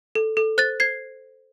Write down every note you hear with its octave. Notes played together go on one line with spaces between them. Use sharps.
A4
A4
C5 F#6 A6
C5 G#6 C7